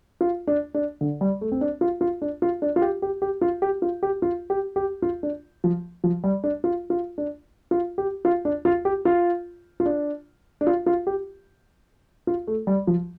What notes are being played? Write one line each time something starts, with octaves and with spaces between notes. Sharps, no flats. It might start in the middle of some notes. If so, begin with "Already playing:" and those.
F4
D4
D4
D3
G3
A3
C4
D4
F4
F4
D4
F4
D4
F4
G4
G4
G4
F4
G4
F4
G4
F4
G4
G4
F4
D4
F3
F3
G3
D4
F4
F4
D4
F4
G4
F4
D4
F4
G4
F4
F4
D4
D4
F4
F4
G4
F4
A3
G3
F3